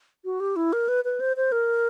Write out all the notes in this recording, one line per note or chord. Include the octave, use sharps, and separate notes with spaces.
F#4
G4
E4
A#4
B4
B4
C5
C5
A#4